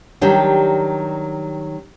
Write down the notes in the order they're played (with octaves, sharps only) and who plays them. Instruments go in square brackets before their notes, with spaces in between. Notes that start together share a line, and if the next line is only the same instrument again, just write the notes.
[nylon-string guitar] D#3 F#3 G3 D4 G4